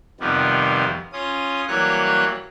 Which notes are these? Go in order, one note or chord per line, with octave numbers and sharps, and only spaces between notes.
F2 C3 D#3 F3 G3 B3
C#4 F4 D#6
E3 F#3 G3 A#3 C#5 F#6